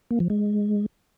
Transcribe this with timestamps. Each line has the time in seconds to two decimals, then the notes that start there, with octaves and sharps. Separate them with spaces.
0.11 A#3
0.20 F3
0.30 G#3